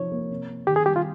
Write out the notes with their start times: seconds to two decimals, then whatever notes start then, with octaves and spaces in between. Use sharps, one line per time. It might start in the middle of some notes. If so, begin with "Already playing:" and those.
Already playing: C3 F3 D#4 C#5
0.11 A#3
0.31 C3
0.49 C4
0.67 D#3 G4
0.76 G#4
0.86 G3 G4
0.96 F4